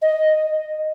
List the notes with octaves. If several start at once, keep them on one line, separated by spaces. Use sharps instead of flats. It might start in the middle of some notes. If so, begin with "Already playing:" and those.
D#5